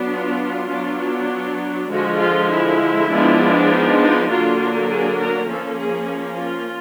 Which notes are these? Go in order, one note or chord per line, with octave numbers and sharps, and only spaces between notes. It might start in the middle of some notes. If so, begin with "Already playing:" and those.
Already playing: F#3 B3 D4
F4
F#3 B3 D4
D3 F3 G#3 F#4
F4
E4
F3 G#3 B3 D4
D#4
D#4
D3 F#3 A#3 D4 F4
G#4
A#4
F3 A#3 C#4 A4
G#4
F4